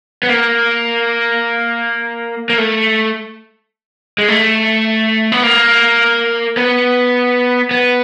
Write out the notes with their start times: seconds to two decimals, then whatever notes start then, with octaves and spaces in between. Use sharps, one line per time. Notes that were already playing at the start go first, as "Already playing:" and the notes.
0.23 B3
0.29 A#3
2.50 A#3
2.58 A3
4.18 G#3
4.28 A3
5.32 B3
5.43 A#3
6.57 B3
7.71 B3